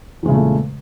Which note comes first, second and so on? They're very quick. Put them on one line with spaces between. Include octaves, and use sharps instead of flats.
E2 G#3 C#3 A#2 A3